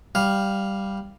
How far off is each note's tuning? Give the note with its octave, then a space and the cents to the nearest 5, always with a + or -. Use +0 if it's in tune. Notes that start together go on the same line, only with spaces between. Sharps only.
G3 +0 F5 +0